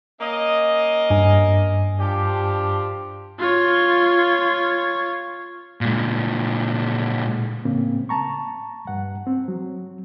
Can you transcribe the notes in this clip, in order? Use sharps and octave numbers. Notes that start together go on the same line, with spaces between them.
A#3 C#4 D#5
G2 G#5
F3 D4 G4
F4 C#5
A#2 G#3
A2 C#3 A#3 C4
A5 A#5 C#6
G2 F#5
C4
F#3